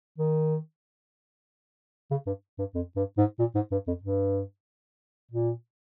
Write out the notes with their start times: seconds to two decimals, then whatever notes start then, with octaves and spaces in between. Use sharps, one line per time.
0.18 D#3
2.11 C#3
2.27 G2
2.59 G2
2.74 F2
2.96 G2
3.18 G#2
3.39 A#2
3.55 G#2
3.71 G2
3.87 F2
4.03 G2
5.31 A#2